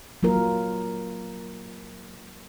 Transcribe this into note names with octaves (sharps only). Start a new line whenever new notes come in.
F#3 A#3 F4 A#4